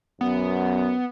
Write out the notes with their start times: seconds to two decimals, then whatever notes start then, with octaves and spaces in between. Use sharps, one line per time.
0.21 F#2 B3